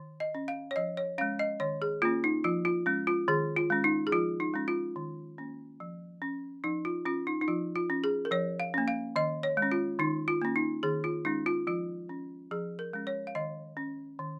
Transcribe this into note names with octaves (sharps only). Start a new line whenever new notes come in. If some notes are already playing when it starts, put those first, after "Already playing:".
Already playing: D#3
D#5
C#4
F5
C#5
F3 D#5
C#5
G#3 C#4 F5
D#5
D#3 C#5
G#4
A#3 C#4 F4
D#4
F3 F4
F4
G#3 C#4
F4
D#3 G#4
F4
G#3 C#4
D#4
G#4
F3 F4
D#4
G#3 C#4
F4
D#3
A#3 C#4
F3
C#4
F3 D#4
F4
C#4 F4
D#4
D#4
F3 F4
F4
C#4
G#4
A#4
F3 C#5
F5
A#3 C#4
F5
D#3 D#5
C#5
G#3
C#4
F4
D#3 D#4
F4
A#3 C#4
D#4
D#3 G#4
F4
G#3 C#4 D#4
F4
F3 F4
C#4
F3 G#4
A#4
G#3 C#4
C#5
F5
D#3 D#5
C#4
D#3